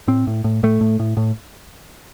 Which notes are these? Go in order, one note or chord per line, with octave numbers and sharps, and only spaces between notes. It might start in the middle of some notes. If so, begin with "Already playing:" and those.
A2 C4
A2
A2
A2 A3
A2
A2
A2